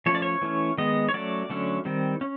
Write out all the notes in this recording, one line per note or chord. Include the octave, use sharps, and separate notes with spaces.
F3 A3 C#4 C#5
D5
C#5
E3 A3 C#4
D#3 G#3 B3 D#5
C#5
F#3 A3 C#4 D5
D3 F#3 A3 C#4
D#3 G3 C4
C#4